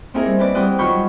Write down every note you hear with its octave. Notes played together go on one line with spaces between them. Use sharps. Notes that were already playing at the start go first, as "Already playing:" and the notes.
A#3 C4 D#4 E4 G#4 A#4
G3
C4 B4 D5
E2 G3 C4 C6 D#6 F#6
D#3 F#3 F4 B5 C#6 G6